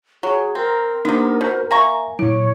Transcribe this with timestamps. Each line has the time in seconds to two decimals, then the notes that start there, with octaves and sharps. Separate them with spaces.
0.23 F#3 G#4
0.55 C4 A#4
1.05 C3 A#3 B3 D4 D#4
1.41 B2 C5 G6
1.71 A#3 E5 G#5 A#5 C#6
2.19 A#2 F#3 E4 C#5